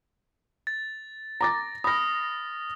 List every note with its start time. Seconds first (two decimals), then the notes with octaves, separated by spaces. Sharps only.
0.67 A6
1.41 A#5 D6 A6 A#6
1.84 B5 D#6 F6 A#6